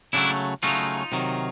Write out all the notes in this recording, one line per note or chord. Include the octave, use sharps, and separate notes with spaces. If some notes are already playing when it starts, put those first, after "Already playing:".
C#3 F#3 A3 D4 E4
C#3 F#3 A3 D#4 F4
C3 D#3 F#3